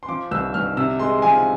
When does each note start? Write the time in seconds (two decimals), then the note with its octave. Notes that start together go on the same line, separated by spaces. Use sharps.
0.03 C6
0.09 F3 D6
0.31 C2 E6
0.54 C2 F6
0.77 C3 E6
0.99 G#3 C6
1.22 F3 G#5